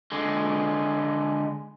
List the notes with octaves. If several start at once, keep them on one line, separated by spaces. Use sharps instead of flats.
D3 G#3